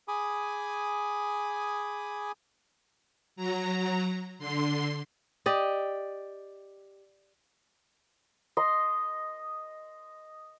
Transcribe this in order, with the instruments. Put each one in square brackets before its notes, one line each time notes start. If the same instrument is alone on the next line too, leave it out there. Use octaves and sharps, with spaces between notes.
[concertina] G#4 G#5 B5 D6 D#6
[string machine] F#3 A#5
D3 C6
[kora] G4 D5 D#5
[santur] D#5 C6